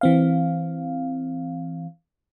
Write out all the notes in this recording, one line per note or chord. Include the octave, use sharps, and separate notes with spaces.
E3 C4 F5